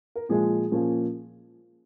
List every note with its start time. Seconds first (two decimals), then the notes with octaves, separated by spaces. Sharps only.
0.16 A#4
0.29 A#2 F3 G#3 G#4
0.71 A#2 F3 A#3 C#4